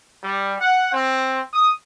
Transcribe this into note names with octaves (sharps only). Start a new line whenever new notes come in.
G3
F#5
C4
D#6